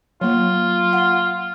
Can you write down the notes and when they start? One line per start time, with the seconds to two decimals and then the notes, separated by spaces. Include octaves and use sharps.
0.21 F#3 A#3 F4
0.93 F#5